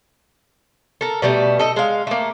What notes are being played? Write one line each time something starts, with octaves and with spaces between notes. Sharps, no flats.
A4 A#4
B2 G3 A3
A4 D#5
G#3 F5
A3 A#3